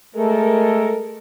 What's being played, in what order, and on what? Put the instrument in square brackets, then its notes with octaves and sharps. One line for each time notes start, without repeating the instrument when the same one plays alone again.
[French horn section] G#3 A4 A#4 [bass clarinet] A3